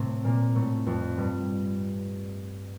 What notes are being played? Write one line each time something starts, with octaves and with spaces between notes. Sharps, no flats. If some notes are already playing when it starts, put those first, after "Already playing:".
Already playing: A2 C3 A3 C4
A#2 A#3
A2 A3
F2 F3
G2 G3